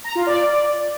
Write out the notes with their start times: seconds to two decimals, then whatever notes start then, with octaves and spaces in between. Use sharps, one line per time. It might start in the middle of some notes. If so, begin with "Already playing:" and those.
0.04 A#5
0.15 F4
0.27 D5